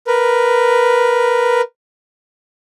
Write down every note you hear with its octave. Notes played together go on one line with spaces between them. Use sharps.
A#4 B4